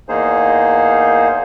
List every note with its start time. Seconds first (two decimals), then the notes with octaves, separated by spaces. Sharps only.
0.09 E2 A#3 D#4 G#4 C5